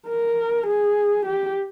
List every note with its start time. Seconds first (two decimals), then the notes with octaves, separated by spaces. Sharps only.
0.09 A#4
0.67 G#4
1.26 G4